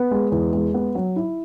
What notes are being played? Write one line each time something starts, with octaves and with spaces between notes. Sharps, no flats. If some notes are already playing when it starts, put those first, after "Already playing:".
Already playing: B3
G#3
E2
G#3
B3
F#3
E4